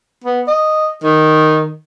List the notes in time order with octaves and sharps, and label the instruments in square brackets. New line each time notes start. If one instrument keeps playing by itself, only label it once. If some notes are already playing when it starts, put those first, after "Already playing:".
[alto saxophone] B3
D#5
D#3